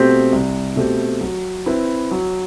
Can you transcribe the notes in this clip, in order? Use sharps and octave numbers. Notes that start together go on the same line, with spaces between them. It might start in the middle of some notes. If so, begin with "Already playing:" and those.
Already playing: B2 A3 C4 G4
C2
B2 A3 C4 G4
F#3
C4 E4 B4
F#3